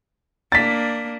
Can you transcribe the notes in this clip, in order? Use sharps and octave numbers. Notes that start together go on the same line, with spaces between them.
A#3 D4 A6 B6